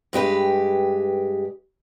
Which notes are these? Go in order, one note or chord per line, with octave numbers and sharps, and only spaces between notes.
G2 G#3 G4 B4